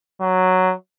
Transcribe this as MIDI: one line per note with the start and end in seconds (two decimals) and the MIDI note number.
0.21 0.74 54